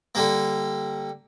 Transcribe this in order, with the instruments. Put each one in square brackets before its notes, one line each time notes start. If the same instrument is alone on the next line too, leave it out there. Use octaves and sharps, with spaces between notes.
[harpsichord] D3 G3 A#3